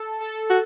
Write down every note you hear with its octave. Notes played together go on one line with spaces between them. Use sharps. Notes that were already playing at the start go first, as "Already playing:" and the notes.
Already playing: A4
A4
F#4